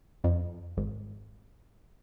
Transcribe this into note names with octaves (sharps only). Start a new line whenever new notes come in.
F2
G#1